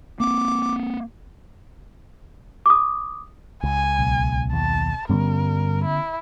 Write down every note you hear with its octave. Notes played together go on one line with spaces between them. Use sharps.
A#3 C4 D6
D6 D#6
C#2 G#5
B1
D#2 A5
G2 D3 G3 B3 C#4 A#4
E4